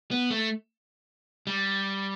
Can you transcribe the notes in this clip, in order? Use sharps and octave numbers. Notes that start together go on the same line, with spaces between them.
B3
A3
G3